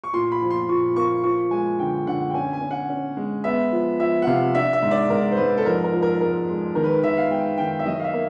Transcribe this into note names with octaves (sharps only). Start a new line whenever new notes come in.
C#6
A#2 C6
B5
F3
C6
A#2 C#6
A#3 C#6
F3 C#6
G#3 G#5
D3 G5
D3 F#5
G5
C#4 G#5
G#5
C#4
F#5
C#4
G#3
B3 E5
F3
F3 E5
F#5
C3 F5
D4 E5
E5
G#2
D5
G#2 A#4
C5
G#2 B4
A4
F2 A#4
A#4
F3
A#4
G#3 A#4
G#3
D#3 A#4
B4
A#4
D#3 E5
F5
G#3 G5
D#3 G5
E5
F#3 D#5
F5
E5
A#3